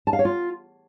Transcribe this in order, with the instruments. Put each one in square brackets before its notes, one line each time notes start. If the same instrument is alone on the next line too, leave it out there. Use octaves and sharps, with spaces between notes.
[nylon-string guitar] A5
F5
C#5
F4